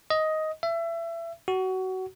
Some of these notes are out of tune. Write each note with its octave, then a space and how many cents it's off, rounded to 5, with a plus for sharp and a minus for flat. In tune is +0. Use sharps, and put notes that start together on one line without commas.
D#5 +10
E5 +25
F#4 +20